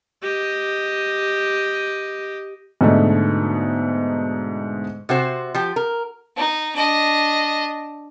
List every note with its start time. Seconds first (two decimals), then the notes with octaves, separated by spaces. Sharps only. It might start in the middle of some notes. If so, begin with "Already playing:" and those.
0.22 G4 D#5
2.81 G#2 B2 D3 A3 D#4
5.09 C3 F#4 C5
5.54 F3 G4
5.76 A#4
6.37 D#4
6.76 D4 D#5